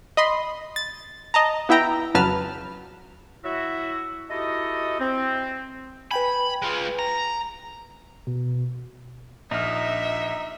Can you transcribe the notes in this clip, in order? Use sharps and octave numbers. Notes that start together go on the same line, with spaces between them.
D#5 B5 C6
A6
D#5 A5 A#5
B3 E4 E5 G5 A#5
F2 C#3 F#3 B4 A5 F6
F#3 E4 F#4 E5
D#4 E4 F#4 G4 A4 D#5
C4
B4 G5 G#5 B5
G#3 F4
A#5
B2
A#1 D#4 E5 F6